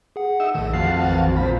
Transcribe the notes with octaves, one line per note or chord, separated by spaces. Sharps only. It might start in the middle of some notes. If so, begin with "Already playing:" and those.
G#4 F#5
D#4 E5 E6
A#1 A2 D#3
F2 F#4 F5 A5 C7
A1 D#3 E3
A#1 A#2 C5 B5